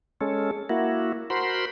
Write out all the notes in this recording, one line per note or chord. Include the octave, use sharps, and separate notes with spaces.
G#3 C#4 A4
A#3 E4 F#4
F#4 A#4 C5 B5 C6